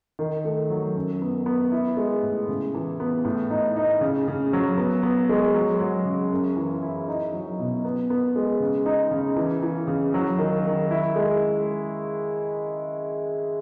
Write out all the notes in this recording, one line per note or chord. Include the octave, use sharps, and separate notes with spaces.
D#3
A3
F#3
F#2
B3
B3
E4
G#3
A2
C#3
E3
B3
A2
D#4
D#4
C#3
C#3
F#3
B3
B3
G#3
F#3
F#3
C#3
F#2
E3
E4
D#4
F#3
B2
B3
B3
G#3
C#3
D#4
C#3
E3
E3
C#3
F#3
D#3
D#3
E4
G#3